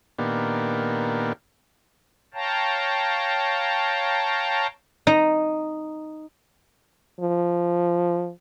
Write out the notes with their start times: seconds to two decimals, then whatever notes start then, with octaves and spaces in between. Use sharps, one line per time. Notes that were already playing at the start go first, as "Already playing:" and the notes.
0.19 A#2 D#3 A#3 B3 D4 G4
2.34 C#5 F5 G5 A5 A#5
5.07 D#4
7.20 F3